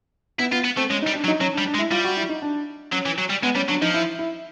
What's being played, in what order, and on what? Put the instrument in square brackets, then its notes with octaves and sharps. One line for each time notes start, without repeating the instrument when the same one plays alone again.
[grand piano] B3 [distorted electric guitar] E4
[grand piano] B3 [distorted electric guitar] F4
[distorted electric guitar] B3
[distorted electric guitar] A3 [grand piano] C4
[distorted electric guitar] G#3 [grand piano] C#4
[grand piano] D#4
[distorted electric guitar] G3
[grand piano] D4
[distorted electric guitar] F#3
[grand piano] D#4
[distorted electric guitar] F#3 [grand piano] C#4
[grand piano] D4
[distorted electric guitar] G3
[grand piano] D4
[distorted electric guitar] G#3
[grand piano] E4
[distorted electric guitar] G3 [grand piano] F4
[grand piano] F#4
E4
D#4
D4
[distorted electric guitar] F#3 [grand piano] C#4
[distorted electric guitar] E3
F#3
G3
[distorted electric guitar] G#3 [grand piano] B3
[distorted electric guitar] G3 [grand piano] C#4
[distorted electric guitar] F#3 [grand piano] D4
[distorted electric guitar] F3 [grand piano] D#4
[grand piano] E4
E4